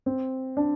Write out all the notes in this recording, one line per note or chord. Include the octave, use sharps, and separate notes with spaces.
C4
D4